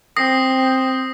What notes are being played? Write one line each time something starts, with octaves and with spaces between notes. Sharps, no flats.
C4 D#6 A#6 C7